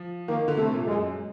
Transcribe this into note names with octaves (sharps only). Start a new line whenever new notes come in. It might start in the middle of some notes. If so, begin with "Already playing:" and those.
Already playing: F3
D#3 A#3
D3
C3 A3
A#2
F#2 G#3